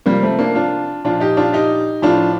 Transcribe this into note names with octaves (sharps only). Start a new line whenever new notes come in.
C3 F3 G3 A#3
A3 C4
A#3 D4
D4 F4
A#2 F3 D4 F4
D#4 G4
D4 F4
D#4 G4
A2 F3 D4 F4